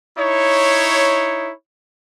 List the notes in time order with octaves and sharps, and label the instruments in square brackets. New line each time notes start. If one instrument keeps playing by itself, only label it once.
[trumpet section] D#4 E4 C#5